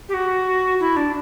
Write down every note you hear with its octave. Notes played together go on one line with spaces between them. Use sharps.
G4
F#4
E4
D4